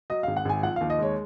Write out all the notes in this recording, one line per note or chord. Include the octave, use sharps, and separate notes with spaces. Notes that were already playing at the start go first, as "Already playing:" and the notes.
F#3 D#5
G#1 F5
F#5
G#1 G#5
F3 F#5
F5
D#2
D#5
G#3 C#5